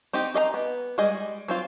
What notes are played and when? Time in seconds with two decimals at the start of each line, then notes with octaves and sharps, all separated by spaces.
0.13 C4 D#4 G4
0.34 G4 D#5 E5 A#5
0.54 B3
0.98 G3 G#3 G#4 D#5
1.48 F#3 C4 F4